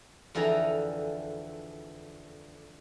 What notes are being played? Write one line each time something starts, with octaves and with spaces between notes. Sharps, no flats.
F2 D3 E3 G#4 A4 A#5